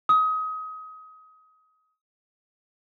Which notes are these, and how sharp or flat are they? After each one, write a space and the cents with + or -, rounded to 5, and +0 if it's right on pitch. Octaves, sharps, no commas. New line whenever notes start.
D#6 +25